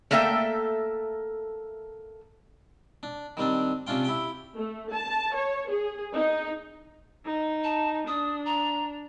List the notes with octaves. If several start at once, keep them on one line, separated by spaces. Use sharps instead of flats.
A3 A#3 A4 E5 G5
D4
D#3 G3 C4 D4
C3 C#4 D4 F4 G5
E4 G4 G5
A3
A5
C#5
G#4
D#4
D#4
A5
D4 D#6
A#5